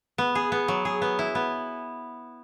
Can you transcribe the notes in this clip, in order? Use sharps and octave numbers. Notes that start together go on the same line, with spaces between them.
B3
G#4
B3
F#3
G#4
B3
E4
B3